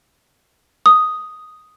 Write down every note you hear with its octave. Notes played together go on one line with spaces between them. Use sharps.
D#6